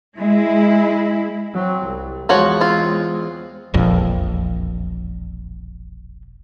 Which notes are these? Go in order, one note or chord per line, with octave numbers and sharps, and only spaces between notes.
G#3 E4
F#3 C4
C2
E2 F3 G#3 F#4 C#5
C4 F4
E1 A#1 F2